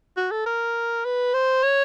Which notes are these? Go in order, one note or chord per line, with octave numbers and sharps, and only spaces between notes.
F#4
A4
A#4
B4
C5
C#5